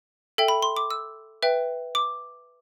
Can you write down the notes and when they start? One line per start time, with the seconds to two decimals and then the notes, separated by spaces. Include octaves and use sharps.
0.38 A4 E5 G5
0.48 B5
0.63 C6
0.77 D6
0.91 E6
1.42 B4 E5 G5
1.95 D6